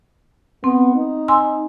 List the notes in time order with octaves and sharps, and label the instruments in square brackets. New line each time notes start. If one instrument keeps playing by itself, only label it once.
[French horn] B3 [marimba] C4
[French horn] D#4
[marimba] G#5 C6 E6